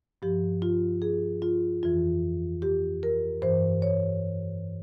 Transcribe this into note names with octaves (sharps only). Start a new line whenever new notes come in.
G2 F3 G4
F4
G#4
F4
F2 E3 F4
G4
A#4
G2 E3 C5
C#5